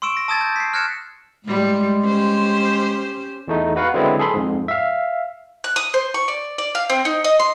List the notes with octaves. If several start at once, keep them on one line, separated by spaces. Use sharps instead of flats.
C6 C#6 E6 D7 E7
A#6
A5 D#6 E6 G#6 A6
G6
B6 C7
F6 F#6 G#6 A#6 C#7 E7
A2 G3 G#3
C#4 G4 C5
E2 A3 D#4
F#4 B4 F5 F#5
D3 F#3 G#3 B3 C4 E4
G#4 A4 B5 C6
F2 G#2
E5 F5
F#6
D#6
C5
C#6
D5
D5
F5
C4
D#4
D#5
C6